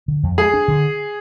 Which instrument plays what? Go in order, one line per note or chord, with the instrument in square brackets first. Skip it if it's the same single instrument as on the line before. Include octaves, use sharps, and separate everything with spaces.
[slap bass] D3
F2
[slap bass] G#3 [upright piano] G#4
[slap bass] D4
D3